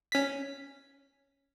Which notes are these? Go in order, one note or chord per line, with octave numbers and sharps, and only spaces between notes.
C#4 B6